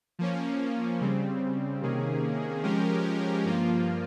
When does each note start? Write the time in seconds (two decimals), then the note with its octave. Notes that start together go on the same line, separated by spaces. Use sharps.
0.19 F3 A#3 C#4
1.01 C#3 G3 C4
1.82 C3 D#3 A#3 C#4 G#4
2.63 F3 G#3 C#4 G4 A#4
3.45 G2 F3 A#3 F4